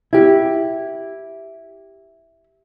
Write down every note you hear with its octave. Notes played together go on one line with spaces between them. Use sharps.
E4 G4